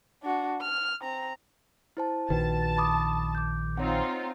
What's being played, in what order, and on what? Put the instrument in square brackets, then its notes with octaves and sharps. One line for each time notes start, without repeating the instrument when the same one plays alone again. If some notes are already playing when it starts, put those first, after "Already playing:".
[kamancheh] D4 F#4
F6
C4 A#5
[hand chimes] E4 C5 A5
[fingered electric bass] A#1 D#3 [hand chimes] F#4 B4 [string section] A5
[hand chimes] B5 D6 D#6
D6 G6
[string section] C4 D#4 F4 [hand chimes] C#5 F#5